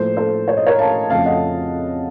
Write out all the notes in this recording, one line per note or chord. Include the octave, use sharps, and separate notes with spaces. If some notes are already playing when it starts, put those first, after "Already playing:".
Already playing: A2 F3 A#3 A4 C5
A4 C5
C#5
D#5
A#4 C#5
F5 A5
F2 C#3 F3 A3 F5 A5
D#5 F#5